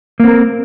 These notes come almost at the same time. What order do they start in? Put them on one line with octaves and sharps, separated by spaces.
A#3 C4 A#4